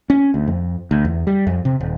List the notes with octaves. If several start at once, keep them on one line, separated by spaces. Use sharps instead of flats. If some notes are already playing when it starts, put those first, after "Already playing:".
C#4
D2
F2
D2
E2
G3
F2
C3
D#1